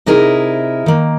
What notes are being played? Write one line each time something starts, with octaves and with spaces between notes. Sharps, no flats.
C3 D#4 E4 G#4 A#4
D#3 A#3